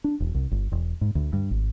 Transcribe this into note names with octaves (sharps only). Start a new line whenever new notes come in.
D4
E1
C2
G1
E1
G#2
D2
G2
G#1